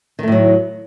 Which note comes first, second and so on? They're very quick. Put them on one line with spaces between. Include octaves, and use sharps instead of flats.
D#3 A3 A2 F#3